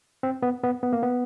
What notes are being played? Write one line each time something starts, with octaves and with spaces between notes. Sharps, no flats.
C4
B3
B3
B3
A#3
B3